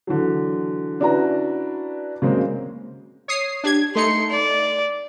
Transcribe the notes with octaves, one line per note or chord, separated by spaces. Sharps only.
D3 E3 F#3
C#4 D4 E4 F#4 B4 A#5
C#3 F#3 G#3 A#3 C4
C#5 D#6 C7
D4 G4 G#6
A3 D#4 C6 C#7
D5